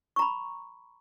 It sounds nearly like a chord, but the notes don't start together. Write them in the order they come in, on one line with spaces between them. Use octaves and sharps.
C#6 A#5 B5